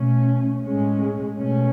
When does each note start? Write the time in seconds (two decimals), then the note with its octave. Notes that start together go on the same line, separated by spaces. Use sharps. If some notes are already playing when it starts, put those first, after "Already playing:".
Already playing: B2 A3 C#4
0.64 A2 G#3 C#4
1.38 B2 A3 C#4